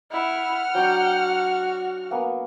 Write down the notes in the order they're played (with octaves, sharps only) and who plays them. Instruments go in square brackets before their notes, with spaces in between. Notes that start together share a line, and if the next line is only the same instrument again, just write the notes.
[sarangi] E4 [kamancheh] F#5 F6
[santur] F#3 D4 [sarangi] G5
[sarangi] F#4
[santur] A#3 B3 G#5